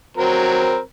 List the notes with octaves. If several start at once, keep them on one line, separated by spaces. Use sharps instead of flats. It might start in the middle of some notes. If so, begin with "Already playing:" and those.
F#3 C4 A#4